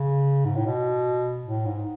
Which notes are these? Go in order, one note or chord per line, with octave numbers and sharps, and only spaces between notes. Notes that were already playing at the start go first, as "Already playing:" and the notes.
Already playing: C#3
G#2
A2
B2
A2
G#2